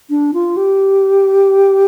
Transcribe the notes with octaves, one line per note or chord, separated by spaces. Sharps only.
D4
F4
G4